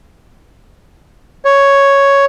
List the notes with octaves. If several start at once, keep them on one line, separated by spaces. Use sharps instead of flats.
C#5